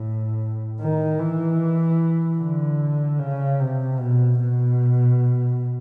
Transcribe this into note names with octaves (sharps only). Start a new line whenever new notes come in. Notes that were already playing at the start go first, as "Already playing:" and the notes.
Already playing: A2
D#3
E3
D3
C#3
C3
B2
B2